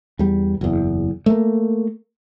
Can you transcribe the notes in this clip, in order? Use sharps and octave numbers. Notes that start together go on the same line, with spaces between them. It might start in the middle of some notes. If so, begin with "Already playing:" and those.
E2 G3
F#1 E2
A3 A#3